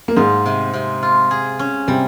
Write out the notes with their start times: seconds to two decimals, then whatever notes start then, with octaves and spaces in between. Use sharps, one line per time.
0.08 A#3
0.16 G#2 G#3 F4
0.46 C3
0.73 C3
1.03 F4
1.31 G#4
1.59 C#4
1.88 C3 G3 C4